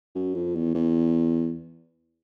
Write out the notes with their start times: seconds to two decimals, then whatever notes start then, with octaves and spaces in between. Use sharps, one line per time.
0.15 F#2
0.34 F2
0.55 E2
0.74 E2